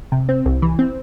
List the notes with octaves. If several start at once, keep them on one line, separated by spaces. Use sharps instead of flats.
C3
C4
C2
E3
C4